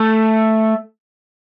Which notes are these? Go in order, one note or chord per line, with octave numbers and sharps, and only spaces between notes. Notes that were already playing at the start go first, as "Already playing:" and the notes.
Already playing: A3